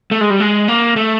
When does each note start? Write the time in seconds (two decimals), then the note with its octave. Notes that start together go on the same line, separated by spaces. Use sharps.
0.11 A3
0.21 G#3
0.30 G3
0.40 G#3
0.68 A#3
0.96 A3